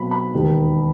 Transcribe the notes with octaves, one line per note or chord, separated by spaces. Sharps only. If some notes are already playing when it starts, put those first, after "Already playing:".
Already playing: B1 B2 F#3 C4 B5
B5
E1 D#2 D#3